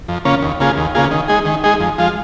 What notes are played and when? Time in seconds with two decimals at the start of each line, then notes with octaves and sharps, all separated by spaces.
0.08 F2
0.25 C#3 A#3 C#4 F4
0.42 D#2
0.60 C#3 A#3 F4 G#4
0.77 D#2
0.95 C#3 A#3 F4 G#4
1.11 D#3
1.28 G#3 D#4 G#4
1.45 D#3
1.64 G#3 D#4 G#4
1.80 F2
1.98 F3 G#3 F4